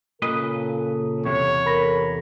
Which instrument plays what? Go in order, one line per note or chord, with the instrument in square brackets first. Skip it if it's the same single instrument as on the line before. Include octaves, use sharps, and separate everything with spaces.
[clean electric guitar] A#2 B4 D#5 [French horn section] C#3 A4
[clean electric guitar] E2 C3 [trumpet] C#5
[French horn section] A4 A#4 [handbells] B5 A#6